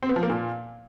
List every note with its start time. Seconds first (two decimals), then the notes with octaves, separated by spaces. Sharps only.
0.03 C4
0.09 B3
0.16 F3
0.23 A#3
0.30 A#2